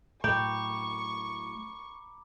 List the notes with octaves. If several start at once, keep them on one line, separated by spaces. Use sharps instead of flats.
A2 F#3 G5 A#5 B5 C#6 D6